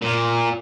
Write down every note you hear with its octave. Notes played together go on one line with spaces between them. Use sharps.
A#2